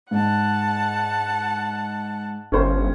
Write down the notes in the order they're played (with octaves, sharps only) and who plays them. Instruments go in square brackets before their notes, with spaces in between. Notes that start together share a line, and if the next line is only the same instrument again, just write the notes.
[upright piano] G#2 [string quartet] F#5 A5
[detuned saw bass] G1 [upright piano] C#4 C5